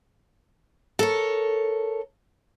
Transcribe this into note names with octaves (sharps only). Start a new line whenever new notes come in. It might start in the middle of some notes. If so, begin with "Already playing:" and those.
A4 A#4 C#5